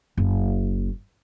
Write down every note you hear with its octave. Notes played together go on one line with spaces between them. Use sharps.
F#1